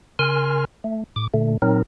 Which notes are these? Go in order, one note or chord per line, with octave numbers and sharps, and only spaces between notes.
C#3 A#4 G#5 C6 F6
A3
A2 D6
A#2 D3 A3
A#2 F#3 C4 D#4 A#4